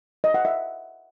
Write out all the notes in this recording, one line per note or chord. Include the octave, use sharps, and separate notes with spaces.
D#5
F#5
E5